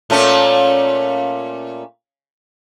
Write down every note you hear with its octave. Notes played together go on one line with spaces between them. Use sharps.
A#2 A3 C#4